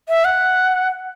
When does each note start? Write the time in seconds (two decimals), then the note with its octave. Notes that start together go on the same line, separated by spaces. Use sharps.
0.09 E5
0.25 F#5